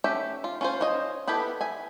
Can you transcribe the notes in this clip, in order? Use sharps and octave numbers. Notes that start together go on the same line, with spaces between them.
A3 C#4 G4 E5
F4
C#4 F4 C5
F4 C5 C#5 D#5
B3 E4 G4 A4 B4
E5 G#5